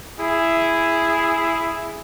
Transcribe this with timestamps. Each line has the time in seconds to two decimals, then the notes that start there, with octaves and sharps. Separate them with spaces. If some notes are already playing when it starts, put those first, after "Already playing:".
0.18 E4 G#4